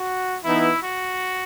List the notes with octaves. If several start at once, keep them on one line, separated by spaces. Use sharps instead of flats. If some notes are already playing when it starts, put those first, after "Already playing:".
Already playing: F#4
E3 B3 D#4 E4
F#4